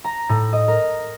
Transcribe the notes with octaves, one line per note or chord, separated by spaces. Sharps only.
A#5
A2
D#5
A#4